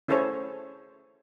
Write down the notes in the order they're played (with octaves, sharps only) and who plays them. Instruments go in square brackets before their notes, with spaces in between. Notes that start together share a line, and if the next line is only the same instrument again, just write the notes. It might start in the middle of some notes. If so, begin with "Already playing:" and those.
[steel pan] C#4 E4 G#4 A4 C5 C#5